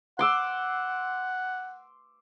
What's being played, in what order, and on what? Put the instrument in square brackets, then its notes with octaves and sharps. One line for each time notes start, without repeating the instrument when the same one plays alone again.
[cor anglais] F#5 [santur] C6 D6 E6